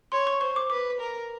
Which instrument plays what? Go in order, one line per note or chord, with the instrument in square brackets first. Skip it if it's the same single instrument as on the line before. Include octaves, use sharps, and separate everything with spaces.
[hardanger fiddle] C#5 [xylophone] C6
[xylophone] C#6
[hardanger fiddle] C5 [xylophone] C#6
[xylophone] D6
[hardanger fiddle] B4 [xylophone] D6
[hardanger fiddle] A#4